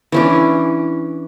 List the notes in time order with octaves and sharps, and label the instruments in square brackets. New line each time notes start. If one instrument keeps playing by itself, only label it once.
[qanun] E3 C#4 D4